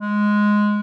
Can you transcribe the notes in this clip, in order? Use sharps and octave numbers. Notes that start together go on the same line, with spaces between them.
G#3